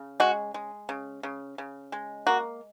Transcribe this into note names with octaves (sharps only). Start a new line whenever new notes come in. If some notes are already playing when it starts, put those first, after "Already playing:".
Already playing: C#3
G#3 F#4
G#3
C#3
C#3
C#3
G#3
A#3 F#4